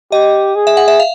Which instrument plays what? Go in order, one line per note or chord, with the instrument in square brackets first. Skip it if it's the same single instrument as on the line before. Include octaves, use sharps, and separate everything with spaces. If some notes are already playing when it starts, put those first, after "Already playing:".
[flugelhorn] G4 [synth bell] D#5
[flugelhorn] G#4
[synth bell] E5
F#5
E5
F5